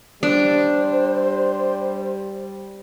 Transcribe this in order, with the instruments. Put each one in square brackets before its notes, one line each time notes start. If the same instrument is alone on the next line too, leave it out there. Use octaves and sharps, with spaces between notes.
[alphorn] G3 [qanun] D4 [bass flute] C5